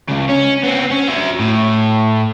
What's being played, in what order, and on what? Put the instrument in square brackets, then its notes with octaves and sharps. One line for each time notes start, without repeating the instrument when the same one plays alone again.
[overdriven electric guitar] C#2 C#3
C#4
B3 C4
C#4
F#4 E5
A2